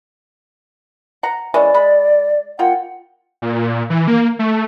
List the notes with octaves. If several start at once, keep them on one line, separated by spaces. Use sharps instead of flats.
F#5 A#5
E3 G#3 C#4 D5
G#3 B5
A#3 F4 F#5 G5
A#2
E3
A#3
A3